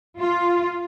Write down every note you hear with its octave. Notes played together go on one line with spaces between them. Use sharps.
F4